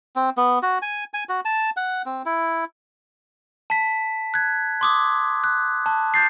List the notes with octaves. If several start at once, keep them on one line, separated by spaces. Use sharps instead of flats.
C4
B3
F#4
G#5
G#5
F#4
A5
F#5
C4
E4
A5 B6
F#6 G#6
C6 D6 D#6
F#6
A5
G6 A6 C7